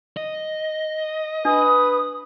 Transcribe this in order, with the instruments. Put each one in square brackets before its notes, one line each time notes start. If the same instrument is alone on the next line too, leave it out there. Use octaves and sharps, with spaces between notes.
[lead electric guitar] D#5
[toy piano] D4 [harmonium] B4 [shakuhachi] D#6